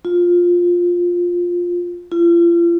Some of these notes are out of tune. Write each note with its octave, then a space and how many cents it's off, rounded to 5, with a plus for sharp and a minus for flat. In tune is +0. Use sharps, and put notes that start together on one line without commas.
F4 +10
F4 -40